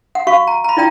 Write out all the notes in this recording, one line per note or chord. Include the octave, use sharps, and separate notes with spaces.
F#5
F#4 F5 C#6
A#5
A#5 B5
E4 F4 D5 G5 A#5